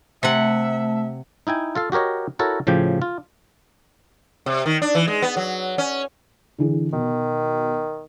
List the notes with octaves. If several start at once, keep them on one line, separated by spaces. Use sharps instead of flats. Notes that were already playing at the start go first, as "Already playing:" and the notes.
C3 A3 E5 F#5 A5
D#4 E4 G5 G#5
F4 A4 F5
F#4 G4 A#4 C#5 D#5
E4 F#4 A4 A#4 C#5
A2 C#3 F3 G4 G5
F4
C3
D#3
D4
E3
G#3
B3
F#3
C#4
D3 E3 G#4
B2 D#3